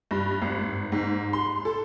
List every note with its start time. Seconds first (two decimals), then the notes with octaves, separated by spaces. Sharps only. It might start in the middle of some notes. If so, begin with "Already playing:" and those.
0.11 G2
0.42 G#1
0.92 G#2
1.33 C6
1.65 A4